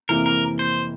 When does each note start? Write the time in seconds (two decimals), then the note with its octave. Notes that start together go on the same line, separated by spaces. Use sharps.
0.09 F2 C3 E3 A#3 E4 A#4
0.26 A#4
0.59 C5